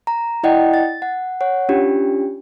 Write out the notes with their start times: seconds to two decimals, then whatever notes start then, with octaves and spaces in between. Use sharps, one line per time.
0.07 A#5
0.43 E4 D5 D#5 F#5 G5
0.74 A6
1.02 F#5
1.41 C#5 F#5
1.69 C#4 D4 F4 G4